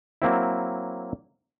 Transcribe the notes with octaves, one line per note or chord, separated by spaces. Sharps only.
F#3 A#3 C4 E4